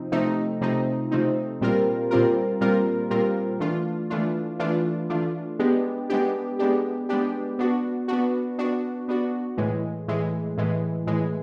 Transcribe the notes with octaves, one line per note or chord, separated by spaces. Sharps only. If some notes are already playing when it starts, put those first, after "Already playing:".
Already playing: C3 F3 C4 D#4
C3 F3 A3 C4 D#4
C3 F3 A3 C4 D#4
C3 F3 A3 C4 D#4
A#2 G3 C4 F4 A#4
A#2 G3 C4 F4 A#4
A#2 G3 C4 F4 A#4
A#2 G3 C4 F4 A#4
E3 A3 D4 F4
E3 A3 D4 F4
E3 A3 D4 F4
E3 A3 D4 F4
G#3 B3 D4 G4
G#3 B3 D4 G4
G#3 B3 D4 G4
G#3 B3 D4 G4
B3 D4 F#4
B3 D4 F#4
B3 D4 F#4
B3 D4 F#4
A2 E3 G#3
A2 E3 G#3
A2 E3 G#3
A2 E3 G#3